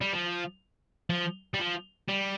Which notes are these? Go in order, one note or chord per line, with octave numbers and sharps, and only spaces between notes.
G3
F3
F3
G3
F3
G3